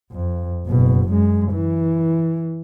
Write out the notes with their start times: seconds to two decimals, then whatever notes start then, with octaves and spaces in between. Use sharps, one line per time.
0.12 F2
0.66 F#1 B2
1.08 F#2 G#3
1.52 E3